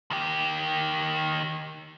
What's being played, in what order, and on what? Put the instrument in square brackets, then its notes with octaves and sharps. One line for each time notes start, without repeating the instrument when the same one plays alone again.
[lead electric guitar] D#3 G4